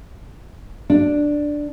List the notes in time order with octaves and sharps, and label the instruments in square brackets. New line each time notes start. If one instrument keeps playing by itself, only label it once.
[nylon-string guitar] D4